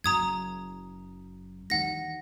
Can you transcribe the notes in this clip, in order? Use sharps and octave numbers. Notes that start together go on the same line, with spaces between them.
F#1 F#2 A#5 D#6 G#6
D#2 E3 F#5 A#6